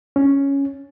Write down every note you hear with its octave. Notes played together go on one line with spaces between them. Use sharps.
C#4